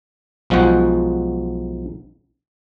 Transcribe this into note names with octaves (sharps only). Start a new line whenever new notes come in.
B1 F3 G#3 F#4 F#5 G5